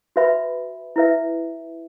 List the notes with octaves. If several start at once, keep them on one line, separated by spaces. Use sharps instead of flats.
F#4 B4 E5 B5
E4 B4 E5